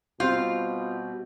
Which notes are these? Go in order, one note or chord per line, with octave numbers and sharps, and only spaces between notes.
B2 G3 C4 F4 G6